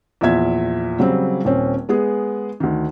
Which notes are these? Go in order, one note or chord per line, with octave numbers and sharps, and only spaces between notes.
E2 A#2 F3 E5 G#6
C#3 F#3 G3 C4
D#1 C4 C#4
G#3 B3 G#4
D2 D#3